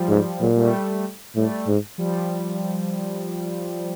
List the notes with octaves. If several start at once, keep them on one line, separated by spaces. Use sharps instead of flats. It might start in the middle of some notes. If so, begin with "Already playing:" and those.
Already playing: F3 G3
G#2
A#2 F#3 G#3
G3 A3
A2 G3 A3
G#2
F3 G3